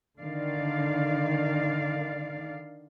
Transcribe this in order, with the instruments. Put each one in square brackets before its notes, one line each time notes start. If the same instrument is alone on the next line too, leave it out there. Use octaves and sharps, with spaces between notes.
[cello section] D3 D#3 D5 F5